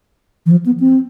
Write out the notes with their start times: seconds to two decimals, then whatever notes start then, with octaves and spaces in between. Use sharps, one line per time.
0.46 E3
0.51 F3
0.66 B3
0.80 C4